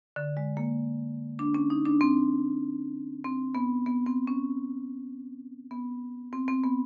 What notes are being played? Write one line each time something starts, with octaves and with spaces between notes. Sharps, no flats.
D3
G#3
A#3
D4
C#4
D#4
D4
C4
C4
B3
B3
C4
C#4
B3
C4
C4
B3